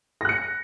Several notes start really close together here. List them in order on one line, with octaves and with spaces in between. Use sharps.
A#6 F#6 C#7